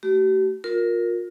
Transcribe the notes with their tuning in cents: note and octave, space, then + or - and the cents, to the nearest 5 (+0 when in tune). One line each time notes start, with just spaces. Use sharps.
A3 -5 G4 -45
F4 +30 A#4 +0